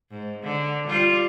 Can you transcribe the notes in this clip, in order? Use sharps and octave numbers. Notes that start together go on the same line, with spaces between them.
G#2
D3
G3 F4